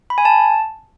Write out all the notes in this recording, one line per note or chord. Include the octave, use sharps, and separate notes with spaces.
B5
G#5
A5